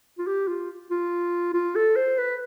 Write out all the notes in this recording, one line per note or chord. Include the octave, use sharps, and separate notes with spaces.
F4
G4
F4
F4
F4
A4
C5
B4